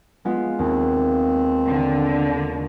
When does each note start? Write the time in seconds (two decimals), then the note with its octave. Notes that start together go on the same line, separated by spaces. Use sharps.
0.25 G#3 B3 F4
0.59 D#2 C4
1.66 D3